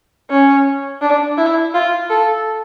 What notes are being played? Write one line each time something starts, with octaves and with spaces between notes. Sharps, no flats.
C#4
D4
E4
F4
A4